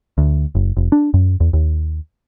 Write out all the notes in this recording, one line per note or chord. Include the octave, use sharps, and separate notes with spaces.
D2
F#1
F1
D4
F#2
E2
D#2